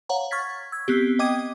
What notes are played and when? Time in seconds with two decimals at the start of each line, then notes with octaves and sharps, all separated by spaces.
0.09 C#5 F5 F#5 A#5
0.31 C#6 F6 G#6 A6 B6
0.72 E6 G#6
0.88 B3 C4 G4
1.19 D#5 G5 D6 D#6 G#6 D#7